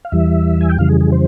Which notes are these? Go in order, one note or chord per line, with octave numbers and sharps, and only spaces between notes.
F5
E2 E3 G3 E5
G#5
G5
F2 C#3 E3 G3 F5
G#4
G#4
C5